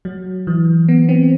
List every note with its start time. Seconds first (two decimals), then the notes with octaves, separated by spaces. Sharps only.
0.05 F#3
0.47 E3
0.88 B3
1.09 C4